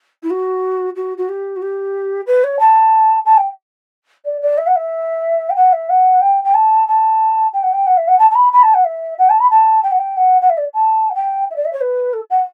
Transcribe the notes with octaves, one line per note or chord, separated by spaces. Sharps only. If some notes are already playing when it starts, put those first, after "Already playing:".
E4
F#4
F#4
F#4
G4
F#4
G4
B4
C#5
A5
A5
G5
D5
D5
E5
F#5
E5
G5
F#5
E5
F#5
G5
G5
A5
A5
G5
F#5
G5
F#5
E5
F#5
A5
A5
B5
B5
A5
F#5
E5
F#5
A5
B5
A5
G5
F#5
G5
F#5
F#5
E5
D5
A5
F#5
G5
E5
D5
E5
C#5
B4
A4
F#5